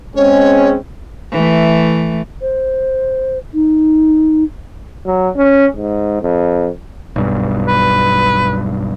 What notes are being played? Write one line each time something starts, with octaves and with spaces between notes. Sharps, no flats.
G#3 C4 C#4 C#5
E3 A3
C5
D#4
F#3
C#4
G#2
F2
B1 G2
B4